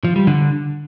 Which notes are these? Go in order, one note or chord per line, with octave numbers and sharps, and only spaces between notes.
F3
G3
D3